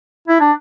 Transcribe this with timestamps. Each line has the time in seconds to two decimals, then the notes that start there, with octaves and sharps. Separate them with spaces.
0.28 E4
0.40 D4